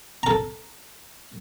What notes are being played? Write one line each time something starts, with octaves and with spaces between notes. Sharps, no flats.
A4 A#5